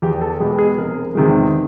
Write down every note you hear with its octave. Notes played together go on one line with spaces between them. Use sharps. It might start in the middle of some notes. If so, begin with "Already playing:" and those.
E2 G4
A4
B2 G#3 B3 G4
G#4
F1 A#4
E2 C3 D#3 G#3